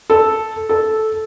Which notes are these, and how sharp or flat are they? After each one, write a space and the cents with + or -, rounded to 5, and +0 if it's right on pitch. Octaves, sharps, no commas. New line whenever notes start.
A4 -5
A4 -10